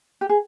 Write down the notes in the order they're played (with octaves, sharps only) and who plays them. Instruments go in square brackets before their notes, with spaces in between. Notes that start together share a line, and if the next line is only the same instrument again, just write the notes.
[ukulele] G4
G#4